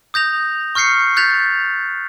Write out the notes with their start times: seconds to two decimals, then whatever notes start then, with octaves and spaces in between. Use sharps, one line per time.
0.14 D#6 G6 A#6 F7
0.75 C#6 F6 G6 C7 C#7
1.17 F#6 G6 A6 B6 F7